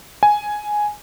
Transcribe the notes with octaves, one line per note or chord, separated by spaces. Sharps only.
G#5